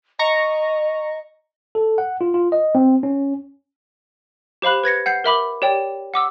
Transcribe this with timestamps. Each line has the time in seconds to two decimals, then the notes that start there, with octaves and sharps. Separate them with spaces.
0.19 D#5 A#5 C#6
1.75 A4
1.98 F#5
2.21 F4
2.34 F4
2.52 D#5
2.75 C4
3.03 C#4
4.62 G4 C5 F5 B5 F#6
4.84 B4 G#6 A#6 C#7
5.06 F#5 G6 C7
5.24 A#4 E5 B5 D6
5.62 G4 C#5 D5 G5
6.14 F#5 D6 E6